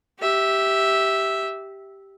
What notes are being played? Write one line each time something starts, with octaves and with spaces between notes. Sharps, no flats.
G4 E5